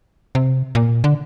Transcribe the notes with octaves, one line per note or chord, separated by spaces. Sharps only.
C3
A#2
D3